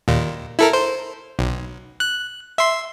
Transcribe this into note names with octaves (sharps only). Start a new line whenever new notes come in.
D#2 A#2
E4 A4 A#4
C5
B1
F#6
E5 C6